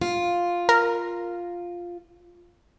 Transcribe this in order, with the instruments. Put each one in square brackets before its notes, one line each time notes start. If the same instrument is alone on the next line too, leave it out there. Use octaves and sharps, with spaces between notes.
[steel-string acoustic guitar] F4
[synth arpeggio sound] A#4